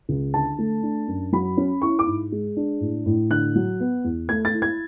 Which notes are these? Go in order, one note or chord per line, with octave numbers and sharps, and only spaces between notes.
C#2
D3 A5
A3
D4
F#2
F#3 B5
C#4
E4 C#6
D6
G#2
G#3
D4
A2
A2
D3 F#6
F#3
B3
E2
A3 G#6
A6
E4
G#6